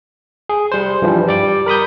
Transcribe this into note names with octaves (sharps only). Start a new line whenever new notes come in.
G#4
G3 C5
G2 E3 F3 G3
G3 D5 D6
A#4 B5 D#6 G6